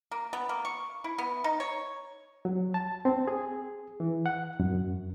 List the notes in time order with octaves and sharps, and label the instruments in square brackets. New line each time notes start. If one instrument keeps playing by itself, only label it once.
[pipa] A#3
B3
A#3
C#6
E4
B3
D#4
C#5
[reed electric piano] F#3
A5
C4
G#4
E3
F#5
F#2